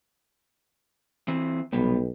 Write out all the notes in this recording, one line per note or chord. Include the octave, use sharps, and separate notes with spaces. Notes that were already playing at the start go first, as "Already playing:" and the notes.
E3 C4
B1 C3 G3 B3